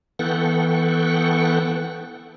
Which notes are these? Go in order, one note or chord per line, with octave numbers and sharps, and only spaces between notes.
E3 B3 A4 F#5 G5 C#6